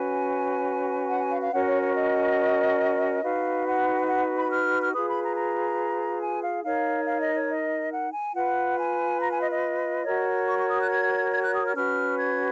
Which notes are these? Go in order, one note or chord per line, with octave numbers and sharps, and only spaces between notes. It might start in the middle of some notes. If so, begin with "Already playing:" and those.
Already playing: C#4 F#4 B4 G#5
F#5
G#5
F5
F5
C#4 F#4 A#4 C#5 F#5
C#5
C#5
D#5
D#4 F#4 B4 F5
F#5
F#5
B5
F6
F6
F4 G#4 B4 D#6
B5
A#5
A#5
G#5
F5
D#4 A#4 C#5 F5
F5
D#5
C#5
D#5
F#5
G#5
F4 B4 F#5
G#5
A#5
G#5
D#5
D#5
F#4 A#4 C#5
C#6
C#6
D#6
F#6
G#6
G#6
F#6
D#6
F6
C#4 F#4 B4 F6
G#6